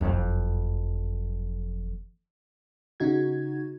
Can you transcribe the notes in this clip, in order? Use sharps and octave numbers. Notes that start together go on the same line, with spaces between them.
F#1 F2
C#3 D#4 F#4 G#6